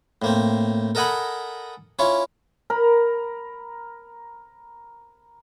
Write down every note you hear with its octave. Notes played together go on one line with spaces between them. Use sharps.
A2 A#3 C4
A4 A#4 D#5 F#5 G#5 B5
C#4 E4 F4 C#5
A#4 A#5 B5